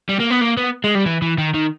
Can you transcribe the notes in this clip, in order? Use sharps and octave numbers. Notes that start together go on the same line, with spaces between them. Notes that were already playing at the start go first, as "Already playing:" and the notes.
G3
A#3
B3
A#3
B3
G#3
G3
E3
E3
D#3
D#3